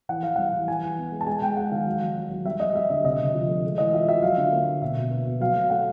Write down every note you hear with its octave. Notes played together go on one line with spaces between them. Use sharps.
E3 F#5
E3 F5
G3 F#5
E3
E3 G#5
E3
B3
G#3
A5
G#3 G#5
G#3 G5
G#3 F#5
D#3 F5
F#3
F#3
F#3
F#3
G3 E5
G3 D#5
G3 E5
D3 D#5
C3 D#5
C3
F3
A3
G#3
E3 D#5
F4 E5
F4 E5
F#3 F5
D3
A#3
A#3
B2 E5
B2
B3
B2
F#3 F5
A3
A3 F#5